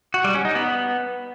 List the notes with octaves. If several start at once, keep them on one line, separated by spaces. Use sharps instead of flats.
F#4
G3
C#4
D#4
B3